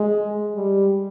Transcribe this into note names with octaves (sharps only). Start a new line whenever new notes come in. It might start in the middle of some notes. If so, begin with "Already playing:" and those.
Already playing: G#3
G3